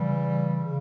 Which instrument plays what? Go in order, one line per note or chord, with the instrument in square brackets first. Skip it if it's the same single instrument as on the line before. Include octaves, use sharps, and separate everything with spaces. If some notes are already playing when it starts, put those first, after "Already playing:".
Already playing: [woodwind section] C#3 E3 G3
C#3